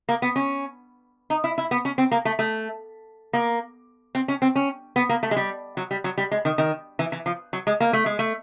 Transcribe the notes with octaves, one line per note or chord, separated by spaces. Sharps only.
A#3
B3
C#4
D#4
E4
E4
B3
C#4
C4
A#3
A3
A3
A#3
C4
C#4
C4
C#4
B3
A#3
A3
G#3
G3
F#3
G3
F#3
G3
G#3
D#3
D#3
E3
E3
F3
F#3
G#3
A#3
A3
G#3
A3